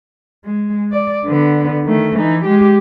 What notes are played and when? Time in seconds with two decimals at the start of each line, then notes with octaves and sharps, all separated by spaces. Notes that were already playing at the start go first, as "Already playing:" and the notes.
0.45 G#3
0.92 D5
1.25 D3 B3
1.85 D#3 A3
2.15 E3 D#4
2.45 G#3 G4